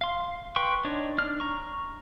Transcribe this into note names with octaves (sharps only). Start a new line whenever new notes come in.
F5 C6
B4 G5 C6 C#6
D4 D#4 C#5
D4 F6
A#5 C#6